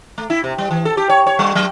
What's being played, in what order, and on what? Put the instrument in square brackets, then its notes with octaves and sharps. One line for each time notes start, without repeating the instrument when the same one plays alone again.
[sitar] A3
E4
C3
G3
E3
A4
G4
C#5
C#5
G3
F#3